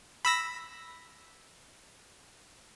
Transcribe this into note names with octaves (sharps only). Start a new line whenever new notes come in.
B5 E6 A#6